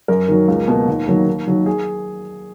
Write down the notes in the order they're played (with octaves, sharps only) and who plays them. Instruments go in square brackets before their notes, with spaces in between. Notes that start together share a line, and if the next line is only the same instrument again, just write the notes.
[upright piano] F#2 A#4
D#3 F#3
C#2
B2 A#3
D#2
D#3 F#3 A#3
D#2
D#3 F#3
G#4